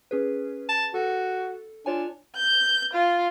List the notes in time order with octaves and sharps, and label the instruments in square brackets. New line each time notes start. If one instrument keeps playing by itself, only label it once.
[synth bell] C#4 G#4 B4
[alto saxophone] A5
[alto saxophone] F#4 [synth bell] A4
[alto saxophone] D4 [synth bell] F4 C#5 G#5
[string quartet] G6
F4